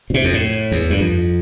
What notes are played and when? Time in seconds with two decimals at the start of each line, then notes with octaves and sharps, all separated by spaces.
0.10 B2
0.14 C3
0.24 F2
0.33 A2
0.72 E2
0.90 G2
0.99 F2